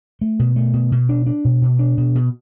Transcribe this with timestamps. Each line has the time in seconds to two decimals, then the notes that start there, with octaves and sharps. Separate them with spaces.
0.21 A3
0.39 B2
0.56 A3
0.74 B2
0.92 B2
1.09 D4
1.27 D4
1.45 B2
1.62 B2
1.79 D4
1.97 B2
2.15 B2